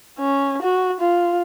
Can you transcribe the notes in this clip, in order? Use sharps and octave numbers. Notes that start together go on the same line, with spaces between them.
C#4
F#4
F4